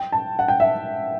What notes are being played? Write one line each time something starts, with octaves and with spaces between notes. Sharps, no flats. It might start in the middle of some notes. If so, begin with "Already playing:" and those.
Already playing: G5
A5
F#5
G5
E5